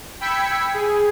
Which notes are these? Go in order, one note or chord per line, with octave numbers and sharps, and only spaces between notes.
G5 B5 E6 G#6 B6 C#7
G#4